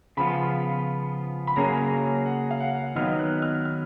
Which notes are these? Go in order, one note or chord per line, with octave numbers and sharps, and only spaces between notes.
C#3 F3 B3 F4 B5
B5
C#3 F#3 A#3 C#4 G#4 A#5
F#5
F5
F#5
D#3 F#3 B3 D#4 F6
F#6
F6
F6